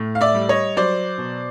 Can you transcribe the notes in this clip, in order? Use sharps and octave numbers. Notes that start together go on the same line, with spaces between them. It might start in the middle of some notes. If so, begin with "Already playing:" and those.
Already playing: A2
F5
D5 E5
G3
C#5 D#5
F#3 C5 D5
B2